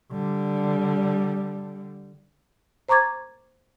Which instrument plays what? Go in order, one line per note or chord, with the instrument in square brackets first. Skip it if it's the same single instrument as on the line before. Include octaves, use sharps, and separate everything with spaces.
[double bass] D3 G3
[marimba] C5 A#5 C#6 D6 G#6 A6